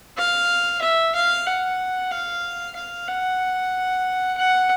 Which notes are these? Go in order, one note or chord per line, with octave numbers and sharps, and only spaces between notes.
F5
E5
F5
F#5
F5
F5
F#5
F#5